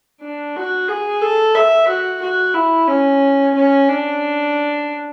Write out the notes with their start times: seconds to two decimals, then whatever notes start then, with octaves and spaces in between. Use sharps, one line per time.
0.22 D4
0.56 F#4
0.88 G#4
1.21 A4
1.55 E5
1.88 F#4
2.22 F#4
2.54 E4
2.88 C#4
3.55 C#4
3.88 D4